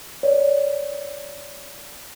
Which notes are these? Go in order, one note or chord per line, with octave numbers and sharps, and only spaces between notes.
C#5 D5